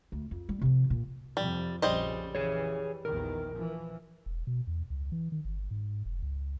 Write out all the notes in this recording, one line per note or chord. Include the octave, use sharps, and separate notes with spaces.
D2
F2
G3
C3 F3
A#2
F2 C3 F3 G3
A#1 F2 C#3 G3 C5 D#5
E3 G#4 C#5
A#1 E2 D#3 A#4
E3 F3
E1
B2
E2
C#2
E3
D#3
G1
G#2
F1
C#2